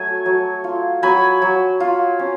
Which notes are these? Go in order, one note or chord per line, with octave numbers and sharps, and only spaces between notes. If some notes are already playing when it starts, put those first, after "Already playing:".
Already playing: F#3 A3 G#5
F#3
F4
F#3 G#5 B5
F#3
F4
C#4